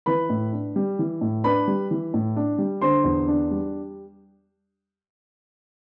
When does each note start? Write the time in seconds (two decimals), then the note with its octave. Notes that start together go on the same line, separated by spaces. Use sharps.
0.06 E3 B4 B5
0.30 A2
0.52 D4
0.76 G3
0.99 E3
1.21 A2
1.44 D4 B4 B5
1.68 G3
1.91 E3
2.14 A2
2.36 D4
2.58 G3
2.82 D3 C5 C6
3.04 E2
3.28 D4
3.51 G3